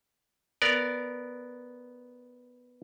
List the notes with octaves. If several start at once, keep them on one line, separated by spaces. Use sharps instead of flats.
B3 A#4 D5